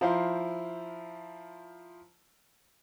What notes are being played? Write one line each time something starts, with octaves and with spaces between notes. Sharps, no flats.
F3 E4 C5 F5 A#5 C6